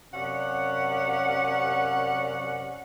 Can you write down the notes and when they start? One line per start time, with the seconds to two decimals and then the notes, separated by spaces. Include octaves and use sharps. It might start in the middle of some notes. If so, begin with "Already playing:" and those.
0.14 F#2 C3 C#4 D5 F5 F#5